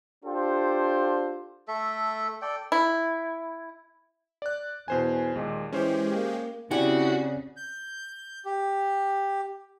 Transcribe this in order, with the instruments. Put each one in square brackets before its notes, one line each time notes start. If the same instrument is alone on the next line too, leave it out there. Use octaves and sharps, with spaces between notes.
[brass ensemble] D4 F4 G4 A4 C5
[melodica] A3 A4 E5
A4 D5 G5
[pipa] E4
[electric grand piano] D5 F#6
[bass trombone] E2 [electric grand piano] B2 C5 G#5
[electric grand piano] D#2 A#2 [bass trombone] G#3
[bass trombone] E3 [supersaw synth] G#3 G4 [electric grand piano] C#4 C5
[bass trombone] A#3
[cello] C#3 [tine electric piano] C4 D5 G#5 [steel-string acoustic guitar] E4 G4 [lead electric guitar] F#4
[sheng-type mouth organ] G6
G4